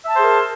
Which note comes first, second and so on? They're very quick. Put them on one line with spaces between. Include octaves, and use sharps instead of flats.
E5 A5 C5 G#4 A#4